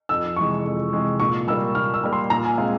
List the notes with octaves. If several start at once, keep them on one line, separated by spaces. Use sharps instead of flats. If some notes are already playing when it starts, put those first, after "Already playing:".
F2 E6
C3 E3 G#3 C#6
F2
C3 E3 G#3
A#2 C#6
G3 A#3 E6
A#2 F6
E6
G3 A#3
C6
A#2 A#5
G#5
G#3 C4 F5